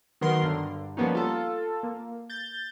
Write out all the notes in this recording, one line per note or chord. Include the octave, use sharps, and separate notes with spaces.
D#3 F#3 B3 A#4 C6
G2 D3
F3 G3 A#3 B3 C#4 D#4
F4 A4
A#3
G6 A6